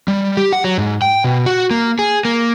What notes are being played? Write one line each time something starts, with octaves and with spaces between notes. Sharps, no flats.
G3
G4
F#5
F#3
G#2
G5
B2
F#4
A#3
G#4
A#3